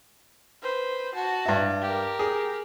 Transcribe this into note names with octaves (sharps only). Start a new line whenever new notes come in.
B4 C5
F#4 A5
G2 E5
G4 A#4
G#4